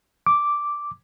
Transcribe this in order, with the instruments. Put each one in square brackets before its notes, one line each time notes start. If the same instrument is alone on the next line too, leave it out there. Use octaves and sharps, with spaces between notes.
[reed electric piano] D6